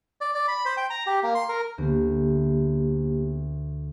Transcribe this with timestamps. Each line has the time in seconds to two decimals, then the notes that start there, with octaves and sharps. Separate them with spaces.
0.21 D5
0.35 D5
0.48 B5
0.65 C5
0.77 G5
0.90 A#5
1.07 G4
1.23 A#3
1.35 C6
1.49 A#4
1.78 D2 A#3 B3 G4